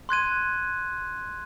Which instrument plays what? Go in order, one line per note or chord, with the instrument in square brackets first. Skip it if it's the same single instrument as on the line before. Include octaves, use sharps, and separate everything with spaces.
[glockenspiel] C6 F#6 G#6 D#7